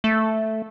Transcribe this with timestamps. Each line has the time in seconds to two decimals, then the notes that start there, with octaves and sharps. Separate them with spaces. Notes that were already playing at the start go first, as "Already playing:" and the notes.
0.04 A3